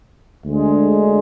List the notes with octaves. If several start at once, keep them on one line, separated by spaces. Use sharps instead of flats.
D2 D3 G#3 D4